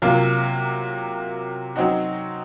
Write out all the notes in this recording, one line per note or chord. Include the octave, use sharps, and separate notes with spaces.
C3 F#3 A#3 F4
F#3 C4 D#4 F#4